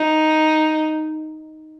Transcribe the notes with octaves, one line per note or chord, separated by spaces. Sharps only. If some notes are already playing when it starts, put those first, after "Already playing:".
Already playing: D#4